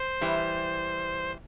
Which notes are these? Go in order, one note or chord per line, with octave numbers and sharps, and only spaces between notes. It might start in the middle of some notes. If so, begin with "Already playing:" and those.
Already playing: C5
E3 G3